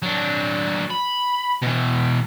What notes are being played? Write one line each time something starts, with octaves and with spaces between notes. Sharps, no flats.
F#3 D4
B5
B2 E3